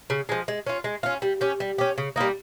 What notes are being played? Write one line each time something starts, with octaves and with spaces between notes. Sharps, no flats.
C#3
F3 G#3
G#3
C#4 F4
G#3
C#4 F4
G3
C#4 G4
G3
C#4 G4
C#3
G3 A#3 D#4